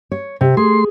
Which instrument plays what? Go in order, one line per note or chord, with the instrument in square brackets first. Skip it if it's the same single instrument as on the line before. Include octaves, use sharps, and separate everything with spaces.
[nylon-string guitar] C#5
C3
[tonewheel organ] A3 C6 [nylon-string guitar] G#4